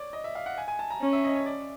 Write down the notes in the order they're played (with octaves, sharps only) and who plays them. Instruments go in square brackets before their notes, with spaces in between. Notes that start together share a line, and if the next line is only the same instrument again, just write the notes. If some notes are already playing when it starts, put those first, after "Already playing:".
Already playing: [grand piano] C#5 D5
D#5
E5
F5
F#5
G#5
G#5
A5
A#5
[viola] C#4
[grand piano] E5
D#5
C#5
D5